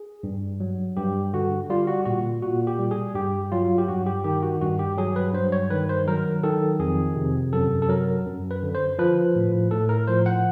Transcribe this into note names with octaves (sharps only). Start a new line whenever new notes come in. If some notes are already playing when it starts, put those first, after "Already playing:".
Already playing: G#4
G2
F#3
G2 G4
D3 F#4
G3 F4
F#4
A#2 F#4
A#2 F#4
G4
G3
G#4
G2 G4
F#3 F4
G4
G2 F#4
G4
D#3 G4
F#4
G2 F#4
G4
F#3 G#4
B4
G2 C5
C#5
D#3 B4
C5
F#3 A#4
D#3 A4
F2 G#4
C3
F#2 A4
A4
F#3 A#4
F#2
B4
D3
C5
F3 B4
A2
A2 A4
A#4
F3 C5
F#5